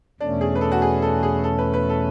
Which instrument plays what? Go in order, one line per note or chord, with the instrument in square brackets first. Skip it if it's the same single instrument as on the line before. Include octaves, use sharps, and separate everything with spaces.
[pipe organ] E2 B2 A3 C#4 [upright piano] D4
[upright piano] G#4
B4
A4
F#4
G#4
A4
G#4
A4
B4
B4
A4